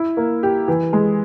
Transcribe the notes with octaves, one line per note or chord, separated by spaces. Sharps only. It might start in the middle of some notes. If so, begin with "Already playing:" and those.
Already playing: E4
A#3
G4
E3
G#3